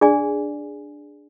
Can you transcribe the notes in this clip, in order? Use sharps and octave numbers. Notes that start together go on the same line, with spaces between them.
D4 G#4 D5 G#5